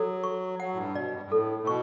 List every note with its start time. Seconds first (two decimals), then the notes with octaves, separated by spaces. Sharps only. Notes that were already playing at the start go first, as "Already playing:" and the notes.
Already playing: F#3 A4
0.24 C#6
0.59 F#3 F#5
0.74 A2
0.78 G2
0.95 B2 D5
1.14 G2
1.25 G2
1.32 A2 A4
1.63 A2
1.67 B2 C#6